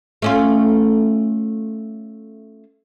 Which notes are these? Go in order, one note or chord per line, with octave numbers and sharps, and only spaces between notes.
A3 C#4 F4